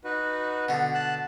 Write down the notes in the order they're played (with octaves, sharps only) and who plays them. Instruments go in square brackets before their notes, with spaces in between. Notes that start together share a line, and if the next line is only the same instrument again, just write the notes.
[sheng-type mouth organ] D#4 F#4 B4
[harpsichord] B2 D3
[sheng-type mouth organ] A5 F#6